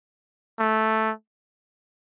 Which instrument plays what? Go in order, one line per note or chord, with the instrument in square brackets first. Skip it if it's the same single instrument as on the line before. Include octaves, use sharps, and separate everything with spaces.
[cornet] A3